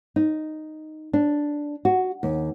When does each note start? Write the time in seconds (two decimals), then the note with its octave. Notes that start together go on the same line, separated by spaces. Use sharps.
0.16 D#4
1.13 D4
1.85 F#4
2.23 D#2